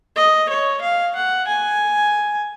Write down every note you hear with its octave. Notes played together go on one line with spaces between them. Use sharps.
D#5
C#5
F5
F#5
G#5